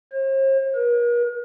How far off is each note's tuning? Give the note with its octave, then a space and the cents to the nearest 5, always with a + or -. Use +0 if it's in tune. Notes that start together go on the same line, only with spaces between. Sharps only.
C5 +45
A#4 +45